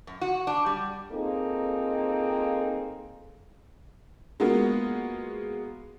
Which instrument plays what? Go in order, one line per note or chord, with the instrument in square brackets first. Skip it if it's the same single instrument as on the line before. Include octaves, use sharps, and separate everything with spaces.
[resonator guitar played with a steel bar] F#2
F#4
D4
G3
[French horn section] A#3 C4 D#4 F4 G#4 A4
[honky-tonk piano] G#3 A#3 B3 F4 F#4